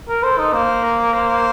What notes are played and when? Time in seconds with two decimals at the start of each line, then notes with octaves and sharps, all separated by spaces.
0.08 A#4
0.23 A4 C5
0.38 D#4
0.52 A#3 C5
0.83 A#4
1.13 C5